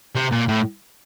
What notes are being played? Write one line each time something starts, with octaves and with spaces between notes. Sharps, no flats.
C3
A#2
A2